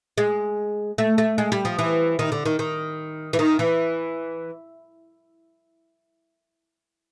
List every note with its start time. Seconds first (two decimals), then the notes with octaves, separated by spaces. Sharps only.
0.18 G#3
0.98 A3
1.18 A3
1.38 G#3
1.52 G3
1.65 F3
1.79 E3
2.19 D#3
2.32 D3
2.45 D#3
2.59 D#3
3.33 E3
3.39 D#3
3.59 E3